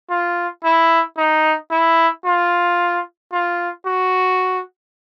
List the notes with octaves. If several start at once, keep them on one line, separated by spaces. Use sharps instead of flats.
F4
E4
D#4
E4
F4
F4
F#4